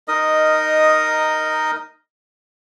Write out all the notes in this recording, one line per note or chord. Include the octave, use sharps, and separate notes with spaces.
D#4 A#4 D#5 D#6